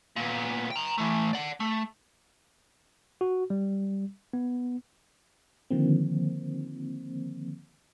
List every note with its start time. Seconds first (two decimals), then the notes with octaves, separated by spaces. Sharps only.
0.17 A#2 B3
0.71 G5 A#5
0.98 E3 A3
1.33 D5 F#5
1.60 A3
3.21 F#4
3.50 G3
4.33 B3
5.70 D3 D#3 F3 A#3 C4